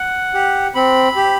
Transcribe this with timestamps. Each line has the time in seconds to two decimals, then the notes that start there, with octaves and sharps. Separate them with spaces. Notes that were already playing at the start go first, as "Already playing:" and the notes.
Already playing: F#5
0.34 G4
0.75 C4 B5
1.16 G4